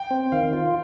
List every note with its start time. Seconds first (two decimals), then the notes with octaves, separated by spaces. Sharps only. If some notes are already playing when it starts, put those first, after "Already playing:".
Already playing: G5
0.11 C4
0.32 D#3 F5
0.53 F4